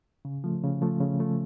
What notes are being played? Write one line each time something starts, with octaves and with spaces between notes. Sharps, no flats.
C#3
F3 A3
C#3
F3 A3
C#3
F3 A3